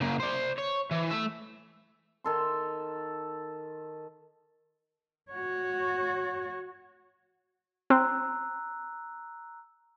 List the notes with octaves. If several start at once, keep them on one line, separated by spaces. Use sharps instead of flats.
C#3 A#3
C5 D5
C#5
E3
A3 E5
D#3 A4 C6
F#4 C#5
C4 A#5 E6 F#6